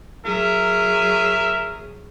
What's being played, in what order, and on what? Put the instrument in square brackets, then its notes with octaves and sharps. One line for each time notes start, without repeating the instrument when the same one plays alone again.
[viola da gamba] F#3 G#4 [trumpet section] A#4 E5